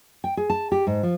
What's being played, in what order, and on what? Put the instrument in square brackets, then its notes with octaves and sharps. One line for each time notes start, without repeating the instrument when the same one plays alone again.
[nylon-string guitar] G5
G#4
A5
G4
G#2
F3